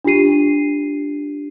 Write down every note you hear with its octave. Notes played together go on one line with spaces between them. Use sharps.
D4 F4 G4 C7 D#7